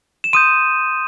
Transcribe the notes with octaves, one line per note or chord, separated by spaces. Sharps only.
E7
C6 D#6 G6 D#7